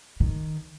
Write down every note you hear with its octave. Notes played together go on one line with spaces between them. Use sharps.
D#3